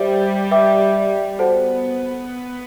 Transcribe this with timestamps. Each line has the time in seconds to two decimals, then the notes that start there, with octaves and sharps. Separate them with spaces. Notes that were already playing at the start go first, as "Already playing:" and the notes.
Already playing: G3 C5 E5 G5 D6
0.51 B4 E5 G5 D6
1.39 B3 F#4 A4 C5 F#5 A5